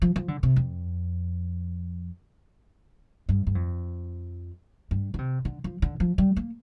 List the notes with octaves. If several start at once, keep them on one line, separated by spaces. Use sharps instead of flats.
F3
F3
D3
C3
F2
G2
G2
F2
G2
D3
C3
D3
F3
D3
F3
G3
A#3